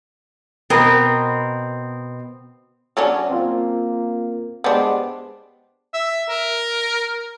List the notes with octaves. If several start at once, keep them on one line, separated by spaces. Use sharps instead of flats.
B2 B3 C4 A#4
F#3 C#4 D4
A#3 C4 F4
G#3 B3 D4 G4 C5 D6
E5
A#4